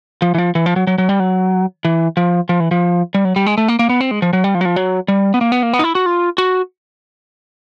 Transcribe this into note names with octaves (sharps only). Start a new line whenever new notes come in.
F3
E3
F3
E3
F3
F#3
F#3
F#3
G3
F#3
E3
F3
F3
E3
F3
G3
F#3
G3
G#3
A3
A#3
A#3
B3
C4
G#3
F3
F#3
G3
F3
F#3
F3
F#3
G3
B3
A#3
B3
A#3
B3
D#4
E4
F#4
F4
F#4